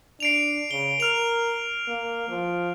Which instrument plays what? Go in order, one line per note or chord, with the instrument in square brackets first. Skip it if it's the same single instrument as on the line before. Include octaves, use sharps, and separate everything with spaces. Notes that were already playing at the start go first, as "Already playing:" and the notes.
[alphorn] D4 [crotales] C7 D7 F7
[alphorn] C#3 [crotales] G7
[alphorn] A#4 [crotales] F6 F7
[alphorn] A#3
F3